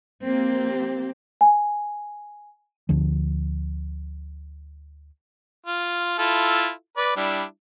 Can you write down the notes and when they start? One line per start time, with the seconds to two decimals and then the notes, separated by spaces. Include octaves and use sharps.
0.24 F3 A#3 C4 G4
1.41 G#5
2.89 D2 D3 F3
5.66 F4
6.19 E4 F4 A4
6.97 B4 D5
7.17 G3 D4 E4